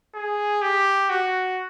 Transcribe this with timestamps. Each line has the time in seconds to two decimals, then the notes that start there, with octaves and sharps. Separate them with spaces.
0.15 G#4
0.62 G4
1.10 F#4